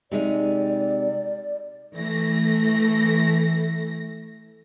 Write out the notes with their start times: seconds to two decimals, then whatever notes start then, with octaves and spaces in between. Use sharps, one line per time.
0.11 C3 G#3 D#4 D5
1.96 E3 A3 A#6